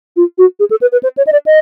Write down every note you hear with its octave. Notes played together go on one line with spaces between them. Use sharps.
F4
F#4
G#4
A4
B4
B4
C5
C#5
D#5
D5
D#5